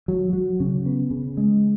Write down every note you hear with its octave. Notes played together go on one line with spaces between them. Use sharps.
F#3
F#3
C#3
B3
C#3
G#3